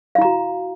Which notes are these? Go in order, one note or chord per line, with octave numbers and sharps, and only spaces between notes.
E4 F#4 F5 A#5